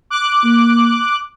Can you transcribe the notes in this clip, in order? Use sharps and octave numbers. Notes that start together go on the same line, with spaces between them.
D6 F#6
A#3